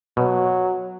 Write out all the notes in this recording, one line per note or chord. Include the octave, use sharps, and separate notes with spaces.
B2 F#3